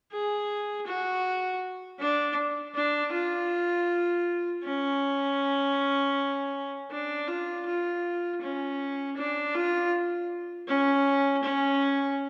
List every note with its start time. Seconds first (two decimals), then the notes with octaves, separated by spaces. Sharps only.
0.12 G#4
0.87 F#4
2.00 D4
2.75 D4
3.13 F4
4.64 C#4
6.91 D4
7.28 F4
7.66 F4
8.42 C#4
9.17 D4
9.54 F4
10.68 C#4
11.43 C#4